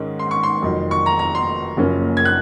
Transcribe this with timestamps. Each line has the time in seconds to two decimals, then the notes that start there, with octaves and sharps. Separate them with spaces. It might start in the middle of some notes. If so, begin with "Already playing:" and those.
Already playing: G#2 D#3 G#3 C#4
0.19 C6
0.31 C#6
0.43 C6
0.62 F1 F2 D#3 F#3
0.91 C#6
1.06 A#5
1.19 A#5
1.35 C6
1.77 F#1 F#2 F3 A#3 C#4
2.17 G#6
2.25 F#6